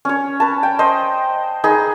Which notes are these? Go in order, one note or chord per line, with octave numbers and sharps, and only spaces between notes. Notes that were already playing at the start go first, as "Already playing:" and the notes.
C#4 C#5
B4 A5
G5
C5 D#5
D#4 G#4 B4 D#5